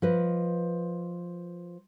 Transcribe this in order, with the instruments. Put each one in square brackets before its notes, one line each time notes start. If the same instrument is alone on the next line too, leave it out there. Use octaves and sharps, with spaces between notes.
[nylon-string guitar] F3 B4 D#5